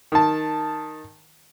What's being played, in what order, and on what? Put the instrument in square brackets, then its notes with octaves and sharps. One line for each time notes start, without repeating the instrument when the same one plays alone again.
[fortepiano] D#3 A5